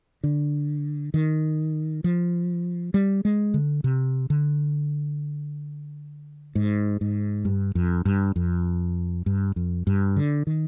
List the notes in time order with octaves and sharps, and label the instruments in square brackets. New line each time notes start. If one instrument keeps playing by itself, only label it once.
[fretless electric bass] D3
D#3
F3
G3
G#3
D3
C3
D3
G#2
G#2
G2
F2
G2
F2
G2
F2
G2
D3
D#3